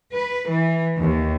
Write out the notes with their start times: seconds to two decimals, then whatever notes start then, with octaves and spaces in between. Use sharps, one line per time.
0.15 B4
0.50 E3
1.00 D#2